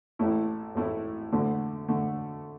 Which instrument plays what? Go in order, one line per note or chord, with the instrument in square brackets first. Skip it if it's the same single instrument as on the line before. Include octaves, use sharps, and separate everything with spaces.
[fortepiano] A1 A2 A3 E4
A1 A2 A3 E4
D2 D3 A3
D3 A3